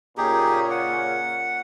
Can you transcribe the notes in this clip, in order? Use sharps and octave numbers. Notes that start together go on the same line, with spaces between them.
A#2 C#3 C#4 D#4 G4 G#4
F#5